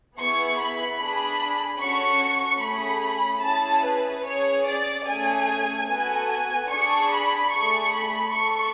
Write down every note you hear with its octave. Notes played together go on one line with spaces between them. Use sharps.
B3 E4 G#4 C#6
B5
D4 G#4
C#4 F#4 A4 C#6
A3 C#4 G#4 B5
C#4 E4 G#4 A5
B4
C#4 G#4 C#5
D5
A3 C#4 G#4 G#5
B3 F#4 A4
G#5
D4 G#4 C#6
B5
A3 D4 G#4 C#6
B5
D4 A4 C#6